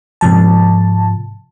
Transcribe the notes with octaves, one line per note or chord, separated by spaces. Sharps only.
G#2 C3 F3 A5